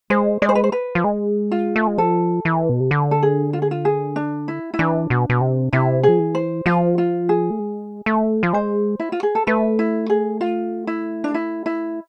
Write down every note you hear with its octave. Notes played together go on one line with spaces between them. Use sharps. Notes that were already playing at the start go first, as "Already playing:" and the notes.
G#3 C5
G#3 D5
C5
B4
C5
B4
F3
G#3
F4
A3
G#3
F3 A4
E3
B2
C3
D3
A4
G#4
F4
G#4
F4
G#4
D4
E4
E4
E3 D4
B2
B2
C3
C3 E4
F3 G#4
E3
C5
F3 F4
F4
G#4
A3
G#3
A3
F3
G#3 C5
E4
F4
G#4
A4
A3 B4
E4
G#4
F4
E4
D4
E4
E4